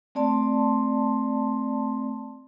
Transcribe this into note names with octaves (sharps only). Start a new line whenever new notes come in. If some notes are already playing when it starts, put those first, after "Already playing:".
A3 C4 D5 A5 C6